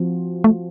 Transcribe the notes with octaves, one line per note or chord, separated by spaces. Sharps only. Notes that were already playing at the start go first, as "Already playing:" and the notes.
Already playing: F3 C4 F#4
A3